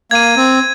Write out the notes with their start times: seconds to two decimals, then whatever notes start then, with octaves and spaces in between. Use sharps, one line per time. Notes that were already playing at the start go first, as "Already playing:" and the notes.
0.11 A#3 G#6 D#7
0.37 C4